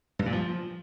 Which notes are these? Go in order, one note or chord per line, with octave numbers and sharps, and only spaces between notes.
G2
A#2
F3